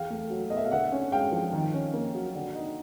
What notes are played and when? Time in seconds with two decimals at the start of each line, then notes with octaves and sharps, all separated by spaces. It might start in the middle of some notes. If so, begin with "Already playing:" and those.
Already playing: E2 F5 G5
0.10 A3
0.30 F#3
0.50 B2 D#5
0.57 E5
0.64 F5
0.71 D3 E5 F#5
0.92 C#4
1.12 G#3 F5 G5
1.32 F3
1.53 D#3
1.74 C#4
1.94 A#3
2.15 F#3
2.35 D3
2.55 D#4